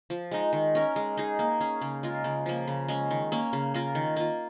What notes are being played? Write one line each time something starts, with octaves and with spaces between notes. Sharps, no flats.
F3
G#3 D#4
D#3
C#4 A#4
G#3
D#4 G#4
A#3
C#4 G#4
C#3
G#3 F4 A#4
C#3
F3 A#3
C#3
G#3 C#4
D#3
A#3 C#4
C#3
A#3 F4 A#4
D#3
A#3 F4